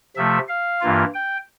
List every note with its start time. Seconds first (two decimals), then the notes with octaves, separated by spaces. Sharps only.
0.16 C3 F3 A3 E5
0.48 F5
0.80 G2 E3 A#3 F4
1.14 G5